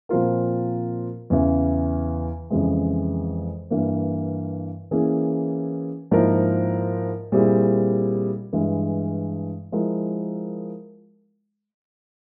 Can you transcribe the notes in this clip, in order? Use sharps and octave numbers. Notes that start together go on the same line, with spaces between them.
A#2 F3 C4 F4 A#4
E2 C#3 E3
F2 C#3 E3 G#3
G2 E3 A#3
E3 A#3 C#4 E4 G#4
G#2 F3 A#3 E4 A#4
A#2 G3 C4 E4 G#4
G2 E3 G#3
F3 G#3 E4 A#4